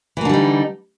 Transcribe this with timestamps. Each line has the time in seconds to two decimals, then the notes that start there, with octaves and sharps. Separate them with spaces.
0.17 E3
0.21 A#3
0.25 D3
0.29 G3
0.34 D#4